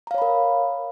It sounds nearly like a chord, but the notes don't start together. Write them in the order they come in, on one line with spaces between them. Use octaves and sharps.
A#5 F5 C#5 B5 A#4